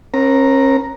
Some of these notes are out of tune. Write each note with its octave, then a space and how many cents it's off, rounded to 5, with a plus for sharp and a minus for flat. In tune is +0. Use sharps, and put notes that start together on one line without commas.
C#4 -40 A#4 +20 A#5 +0